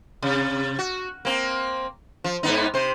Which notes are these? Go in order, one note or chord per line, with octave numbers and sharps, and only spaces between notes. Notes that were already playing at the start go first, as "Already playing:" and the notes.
C3
F#4
A#3 C4
F3
G#2 B3 D#4
C3 C5